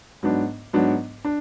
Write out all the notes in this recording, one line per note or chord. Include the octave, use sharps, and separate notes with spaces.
G#2 F#3 B3 D4
G#2 F#3 B3 D4
D4